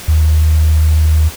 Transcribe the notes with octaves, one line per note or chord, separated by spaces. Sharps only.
D#2